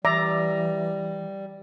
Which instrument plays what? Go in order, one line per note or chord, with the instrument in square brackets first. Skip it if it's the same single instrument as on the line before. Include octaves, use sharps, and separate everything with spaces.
[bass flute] E3 [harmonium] G3 [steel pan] D5 E5 A#5